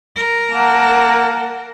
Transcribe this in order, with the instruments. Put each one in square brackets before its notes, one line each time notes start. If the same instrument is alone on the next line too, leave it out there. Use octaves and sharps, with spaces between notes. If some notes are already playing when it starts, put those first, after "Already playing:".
[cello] A#4
[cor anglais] A#3 [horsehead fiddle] F#5 A5